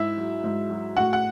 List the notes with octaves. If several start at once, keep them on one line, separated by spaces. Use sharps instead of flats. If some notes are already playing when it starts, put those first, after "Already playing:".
Already playing: G#2 E4 E5
F#3
G#2
F#3
A2 F#4 F#5
F#5